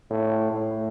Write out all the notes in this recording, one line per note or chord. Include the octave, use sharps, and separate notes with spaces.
A2
A2